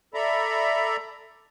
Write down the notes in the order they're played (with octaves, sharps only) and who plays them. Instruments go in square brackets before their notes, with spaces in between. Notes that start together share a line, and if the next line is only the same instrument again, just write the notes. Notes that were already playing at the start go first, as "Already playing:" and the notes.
[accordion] A4 D5 E5 A#5 B5